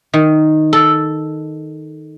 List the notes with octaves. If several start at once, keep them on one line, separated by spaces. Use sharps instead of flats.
D#3
A4